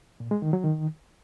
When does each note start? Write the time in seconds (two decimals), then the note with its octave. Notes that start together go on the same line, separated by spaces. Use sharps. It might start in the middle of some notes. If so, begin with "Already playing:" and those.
0.20 A#2
0.31 G#3
0.42 D#3
0.53 F#3
0.64 D#3